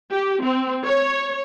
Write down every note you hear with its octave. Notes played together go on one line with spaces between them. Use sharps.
G4
C4
C#5